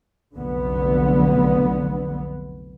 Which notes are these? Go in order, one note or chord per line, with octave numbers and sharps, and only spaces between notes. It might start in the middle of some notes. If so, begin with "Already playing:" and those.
F1 B1 D3 B3